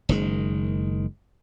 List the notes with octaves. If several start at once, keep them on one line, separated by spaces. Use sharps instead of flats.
F#1 D#3 G#3